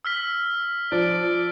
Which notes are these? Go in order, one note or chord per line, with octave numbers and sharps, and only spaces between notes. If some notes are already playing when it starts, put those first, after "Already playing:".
E6 F6 B6
F3 D5